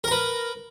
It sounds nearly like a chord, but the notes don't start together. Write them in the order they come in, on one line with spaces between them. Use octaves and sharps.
A#4 A#5 B4